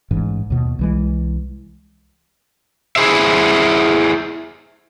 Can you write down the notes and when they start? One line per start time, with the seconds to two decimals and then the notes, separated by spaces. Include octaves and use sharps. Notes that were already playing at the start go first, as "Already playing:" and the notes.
0.11 A1 G#2 E3
0.50 D#2 B2
0.79 C2 E3 G#3
2.96 E4 G#4 C5 E5